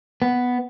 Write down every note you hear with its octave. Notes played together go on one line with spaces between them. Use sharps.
B3